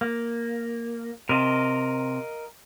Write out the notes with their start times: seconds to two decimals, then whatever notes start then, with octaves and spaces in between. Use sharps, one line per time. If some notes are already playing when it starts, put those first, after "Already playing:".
0.01 A#3
1.29 C3 A#4 D#5 F5